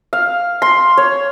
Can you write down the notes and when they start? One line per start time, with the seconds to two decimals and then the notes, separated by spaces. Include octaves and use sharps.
0.13 F5
0.62 C6
0.97 C#5